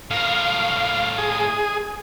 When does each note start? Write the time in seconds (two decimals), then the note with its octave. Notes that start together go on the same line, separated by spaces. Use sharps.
0.11 A2 A#4 F5
1.18 G#4